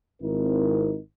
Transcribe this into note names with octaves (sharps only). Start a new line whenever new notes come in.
G#1 C4 D#4 E4 A#4